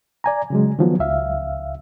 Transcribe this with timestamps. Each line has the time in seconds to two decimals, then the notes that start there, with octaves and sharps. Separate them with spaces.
0.24 D5 G#5 A#5
0.50 C#3 F#3 G#3
0.79 D#3 F3 F#3 B3
0.99 C#2 E5 F5